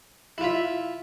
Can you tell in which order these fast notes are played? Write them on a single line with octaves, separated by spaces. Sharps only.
E4 F4 E5